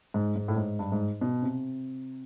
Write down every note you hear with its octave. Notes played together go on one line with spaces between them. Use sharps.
G#2
G#2
A2
G#2
G2
G#2
B2
C3